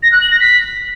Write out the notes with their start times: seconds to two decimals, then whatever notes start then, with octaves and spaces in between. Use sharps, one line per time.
0.03 A#6
0.12 F#6
0.21 F#7
0.31 A#6
0.40 B6